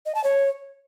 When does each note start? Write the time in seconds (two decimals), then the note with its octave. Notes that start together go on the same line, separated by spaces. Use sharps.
0.06 D#5
0.15 A5
0.24 C#5